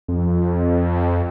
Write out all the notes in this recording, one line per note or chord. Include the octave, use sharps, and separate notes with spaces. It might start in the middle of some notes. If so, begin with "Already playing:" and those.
F2